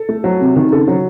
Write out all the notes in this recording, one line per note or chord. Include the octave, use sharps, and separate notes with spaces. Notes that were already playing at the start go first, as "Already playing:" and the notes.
Already playing: A4
A3
F#3
C3
D#3
C#3 A4
F#3